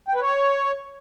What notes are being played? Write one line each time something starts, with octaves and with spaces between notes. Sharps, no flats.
G5
B4
C#5